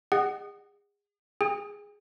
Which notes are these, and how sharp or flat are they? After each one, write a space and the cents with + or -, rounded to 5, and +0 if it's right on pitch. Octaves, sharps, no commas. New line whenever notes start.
G#4 -30 D#5 -20 F#5 +20
G#4 +0 G5 +45